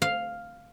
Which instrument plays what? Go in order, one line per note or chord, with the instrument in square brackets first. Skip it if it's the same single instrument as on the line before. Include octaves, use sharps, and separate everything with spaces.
[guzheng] F5